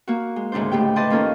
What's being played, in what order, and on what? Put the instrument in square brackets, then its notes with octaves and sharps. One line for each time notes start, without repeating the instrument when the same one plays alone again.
[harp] A#3 F#4
G#3
D2 G#2 C#3 D4 C5
A2 A3 G4 G5
B4 D5 D#5 A5 C6 G6
D#2 A#3 C#4 F4 A4 A#4